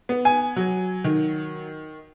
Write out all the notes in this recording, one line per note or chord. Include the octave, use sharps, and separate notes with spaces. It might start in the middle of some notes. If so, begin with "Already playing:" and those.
B3
G#5
F#3
D#3